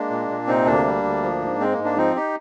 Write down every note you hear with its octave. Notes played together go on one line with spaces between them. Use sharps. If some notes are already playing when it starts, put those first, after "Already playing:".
Already playing: G#3 A#3 D4
A#2
A#2
C3 C4 D#4
D2 A#3 D4
G3
D2
F3
G#2
G#3 C4
A#3
G#2
A#3 D4
F3 C4 D#4
D#4 G4